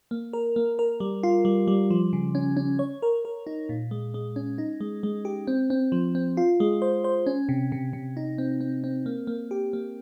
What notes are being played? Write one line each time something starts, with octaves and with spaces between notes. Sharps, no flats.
A#3
A#4
A#3
A#4
G3
F4
G3
G3
F3
C#3
C#4
C#4
C#5
A#4
A#4
D#4
A#2
G#3
G#3
C#4
D#4
G#3
G#3
G4
C4
C4
F3
C4
F4
G#3
C5
C5
C#4
C3
C3
C3
D#4
C4
C4
C4
A#3
A#3
G4
A#3